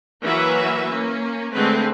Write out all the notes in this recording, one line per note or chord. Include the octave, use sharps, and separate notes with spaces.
E3 F#3 A#3 F#4 B4 E5
A#3 C#4
D3 G#3 A3 C4 B4